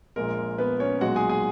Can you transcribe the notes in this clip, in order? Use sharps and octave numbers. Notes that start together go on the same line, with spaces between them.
A#1 A#2 G#3 A#4
B3 B4
C#4 C#5
B1 A#2 G#3 F#4 F#5
G#4 G#5
G#4 G#5